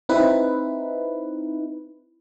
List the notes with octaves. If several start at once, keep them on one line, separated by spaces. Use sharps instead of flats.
C4 D#4 E4 B4